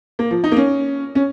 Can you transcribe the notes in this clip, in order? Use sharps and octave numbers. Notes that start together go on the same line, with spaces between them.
A#3
F3
D#4
A#3
C#4
C#4